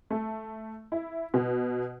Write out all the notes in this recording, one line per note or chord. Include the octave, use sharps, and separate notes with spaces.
A3
E4
B2